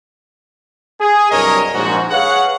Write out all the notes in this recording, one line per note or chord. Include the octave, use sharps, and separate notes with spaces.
G#4
C2 G2 F#3 A#4 C#5 D#5
A#1 G#2 F#4
G#4 B4 C#5 F5 F#5